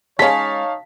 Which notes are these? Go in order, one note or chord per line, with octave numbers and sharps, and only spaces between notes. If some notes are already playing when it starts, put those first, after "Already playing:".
G#3 C#4 D#4 C#5 F5 A5 B6